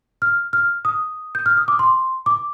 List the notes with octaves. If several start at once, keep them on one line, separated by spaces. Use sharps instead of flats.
F6
F6
D#6
G6
F6
D#6
D6
C6
D6